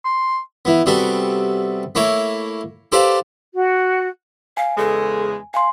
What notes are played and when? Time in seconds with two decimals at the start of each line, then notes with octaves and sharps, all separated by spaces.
0.05 C6
0.65 E3 B3
0.86 C3 G3 B3 F#4 A4
1.95 A3 A#3 E4 C#5
2.92 G4 A4 B4 C5 D5 F5
3.55 F#4
4.57 F5 G#5
4.78 E2 C#3 G#3 A4
5.54 F5 G#5 C6